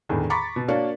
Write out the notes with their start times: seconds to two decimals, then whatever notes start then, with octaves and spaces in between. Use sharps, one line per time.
0.09 E2 A2 D3 D#3
0.30 A#5 B5 C#6 D6 A6 B6
0.56 B2
0.68 A#3 D4 F#4 C#5 D5 F5